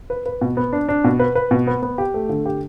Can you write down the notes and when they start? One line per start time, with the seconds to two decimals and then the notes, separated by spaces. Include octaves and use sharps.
0.10 B4
0.26 B4
0.41 B2
0.57 B3
0.73 D4
0.89 D4
1.04 B2
1.19 B4
1.35 B4
1.51 B2
1.67 B3
1.82 B3
1.98 G4
2.14 A3
2.29 D3
2.46 G4